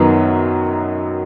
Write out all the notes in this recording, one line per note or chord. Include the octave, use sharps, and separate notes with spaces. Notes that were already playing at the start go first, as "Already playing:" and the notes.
Already playing: F#2 D#3 F#3 B3